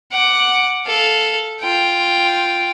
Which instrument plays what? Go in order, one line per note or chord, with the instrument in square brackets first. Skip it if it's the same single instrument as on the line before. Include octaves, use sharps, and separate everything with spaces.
[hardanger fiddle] F#5 D6
A4 F5
F4 G5